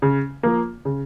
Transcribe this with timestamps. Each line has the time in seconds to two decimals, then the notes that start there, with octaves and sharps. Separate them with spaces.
0.02 C#3
0.43 F3 A#3
0.85 C#3